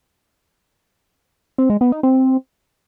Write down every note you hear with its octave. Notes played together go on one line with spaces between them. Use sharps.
C4
G#3
B3
D#4
C4